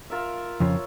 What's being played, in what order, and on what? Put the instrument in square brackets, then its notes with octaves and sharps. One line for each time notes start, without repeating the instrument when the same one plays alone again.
[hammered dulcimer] F4 A#4 E5
[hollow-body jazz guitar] F2 C#3 F3 [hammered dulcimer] C#5